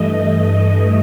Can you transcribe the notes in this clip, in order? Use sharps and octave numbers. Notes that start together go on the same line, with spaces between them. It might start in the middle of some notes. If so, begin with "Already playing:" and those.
Already playing: G2 E3 A3 D#5